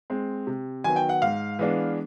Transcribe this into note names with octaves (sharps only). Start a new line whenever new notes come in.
G#3 C4
C3
D#3 F#3 B3 G#5
G5
F#5
G#2 F5
E3 G#3 B3 D4